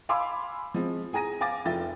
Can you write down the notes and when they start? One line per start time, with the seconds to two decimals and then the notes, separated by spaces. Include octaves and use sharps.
0.09 F5 G#5 B5 C6 D6 E6
0.74 F3 G#3 C4
1.13 G#4 G#5 A#5 A#6 D#7
1.40 F5 G#5 D6 A6 A#6
1.65 F1 F4 E5 G5 A6